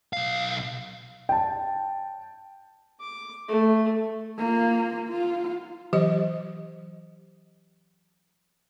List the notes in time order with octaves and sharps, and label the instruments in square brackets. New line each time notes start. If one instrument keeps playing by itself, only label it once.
[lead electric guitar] B1 F5
[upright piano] G5 A5
[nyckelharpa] D6
A3
[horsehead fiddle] A#3 F4
F4
[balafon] E3 F#3 G4 C5 D#5